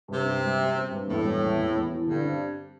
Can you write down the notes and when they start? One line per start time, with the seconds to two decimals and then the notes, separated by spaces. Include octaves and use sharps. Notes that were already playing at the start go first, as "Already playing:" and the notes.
0.08 G2 C3
0.25 C4
0.43 G3
0.59 C4
0.75 C4
0.91 G2
1.08 E2 A2
1.24 G3
1.42 E2
1.58 E2
1.74 E2
1.90 E4
2.06 G2 D3
2.23 C4